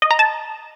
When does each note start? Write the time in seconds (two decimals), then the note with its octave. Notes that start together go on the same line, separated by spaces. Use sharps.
0.02 D#5
0.11 A#5
0.19 A5